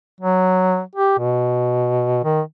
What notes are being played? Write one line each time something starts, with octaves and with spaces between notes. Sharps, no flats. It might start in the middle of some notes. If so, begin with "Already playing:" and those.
F#3
G4
B2
D#3